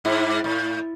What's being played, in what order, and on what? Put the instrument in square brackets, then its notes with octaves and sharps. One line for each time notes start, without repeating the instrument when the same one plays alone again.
[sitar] G#2 [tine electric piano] E4
[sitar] A2